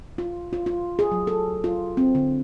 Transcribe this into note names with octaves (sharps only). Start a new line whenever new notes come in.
F4
F4
F4
G#4
F#3
A4
F4
C4
D3